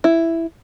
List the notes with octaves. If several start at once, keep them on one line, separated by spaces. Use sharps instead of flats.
E4